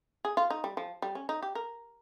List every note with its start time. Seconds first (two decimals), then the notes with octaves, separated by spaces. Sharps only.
0.25 G#4
0.37 F4
0.50 D#4
0.64 G3
0.77 F3
1.02 G3
1.15 C#4
1.29 D#4
1.42 G4
1.55 A#4